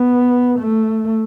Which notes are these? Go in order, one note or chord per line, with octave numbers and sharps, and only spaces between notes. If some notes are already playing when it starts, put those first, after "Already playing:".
Already playing: B3
A3